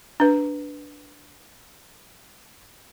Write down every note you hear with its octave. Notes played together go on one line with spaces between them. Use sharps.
D4 B4